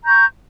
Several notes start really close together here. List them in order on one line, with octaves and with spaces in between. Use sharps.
A#5 G6 C#6